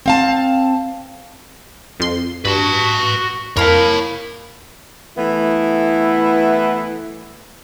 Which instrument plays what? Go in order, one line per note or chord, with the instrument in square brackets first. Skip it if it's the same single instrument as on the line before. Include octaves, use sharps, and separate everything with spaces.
[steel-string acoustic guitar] C4 F5 A5
[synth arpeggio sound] F2 C6
[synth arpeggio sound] G2 [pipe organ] F#4 [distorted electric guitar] B4 A5
[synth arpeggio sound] F2 [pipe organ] E4 [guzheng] A#4 F5 [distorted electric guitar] C#5 A5
[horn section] E3 A3 B3 E4